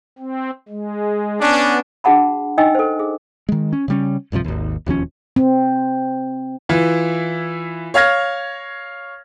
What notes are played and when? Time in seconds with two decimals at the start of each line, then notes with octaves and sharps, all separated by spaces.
0.18 C4
0.69 G#3
1.40 B3 C#4 D4
2.04 D4 F#4 G#4 F#5 A5 B5
2.58 D#4 D#5 G5 G#5 E6
2.75 A4 C5
2.99 G#4
3.49 D#3 G#3
3.73 C#4
3.88 C#3 G3 C#4
4.32 D1 G2 C3 F3
4.45 G#1 D#2
4.86 E1 D#2 F3 C#4
5.36 C4
6.69 E3 E4 F4
7.94 C#5 F5 F6 G#6 A#6